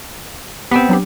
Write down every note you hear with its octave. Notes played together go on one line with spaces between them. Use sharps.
B3 C4 G4 G5
F#3 D4 G4